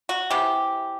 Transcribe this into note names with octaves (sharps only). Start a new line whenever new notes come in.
F#4
C3 E3 B3 G4